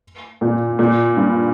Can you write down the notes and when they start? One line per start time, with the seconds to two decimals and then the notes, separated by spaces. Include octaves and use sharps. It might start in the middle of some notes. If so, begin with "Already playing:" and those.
0.41 A#2
0.79 A#2
1.17 G2